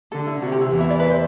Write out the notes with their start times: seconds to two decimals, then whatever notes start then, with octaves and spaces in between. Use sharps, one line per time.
0.12 D3 A4
0.27 E4
0.41 C3 F#4
0.52 G4
0.61 E4
0.71 E2 E3
0.81 E5
0.90 D5
1.00 B4
1.10 C5